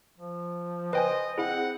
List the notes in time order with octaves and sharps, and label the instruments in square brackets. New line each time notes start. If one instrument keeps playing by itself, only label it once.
[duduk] F3
[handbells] B4 G5 G#5 [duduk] C5 [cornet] D#5
[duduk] C4 [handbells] E4 G#4 [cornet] F#5